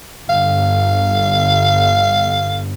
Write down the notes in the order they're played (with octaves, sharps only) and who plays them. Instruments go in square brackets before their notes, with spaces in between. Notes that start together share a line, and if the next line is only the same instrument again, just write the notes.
[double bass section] G1 [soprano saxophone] F5